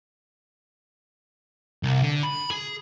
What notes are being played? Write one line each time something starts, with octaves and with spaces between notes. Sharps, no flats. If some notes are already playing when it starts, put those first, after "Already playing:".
C2
D3
B5
G#4